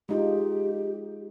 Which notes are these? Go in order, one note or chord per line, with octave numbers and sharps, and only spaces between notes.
G#3 D#4 F4 G4